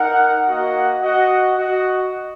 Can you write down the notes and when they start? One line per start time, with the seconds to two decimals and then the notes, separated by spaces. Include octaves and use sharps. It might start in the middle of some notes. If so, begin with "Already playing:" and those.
Already playing: D#4 A#4 F#5
0.48 A#3 F#4 D#5 F#5
1.02 F#4 D#5 F#5
1.57 F#4 D#5 F#5